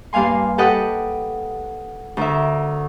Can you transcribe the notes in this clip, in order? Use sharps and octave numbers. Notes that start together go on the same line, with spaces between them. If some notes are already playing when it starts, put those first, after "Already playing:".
G2 A#3 F5 G#5 C6
G4 A4 B4 D#5 F#5
D2 A#4 E5